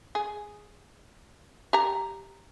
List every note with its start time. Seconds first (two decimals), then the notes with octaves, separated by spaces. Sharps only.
0.15 G#4
1.73 G4 A#5